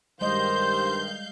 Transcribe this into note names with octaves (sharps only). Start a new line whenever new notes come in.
G2 D#3 G3 G#3 C5 D#5 F5 G6